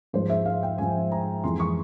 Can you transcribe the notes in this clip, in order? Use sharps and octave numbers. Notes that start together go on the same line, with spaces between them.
G#2 F3 G#3 C5
E5
F5
G5
G#2 F3 G#3 G#5
A#5
F2 E3 G#3 C6
C#6